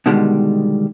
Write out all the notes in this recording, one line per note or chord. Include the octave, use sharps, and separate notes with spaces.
B2 D3 D#3 G3 G#3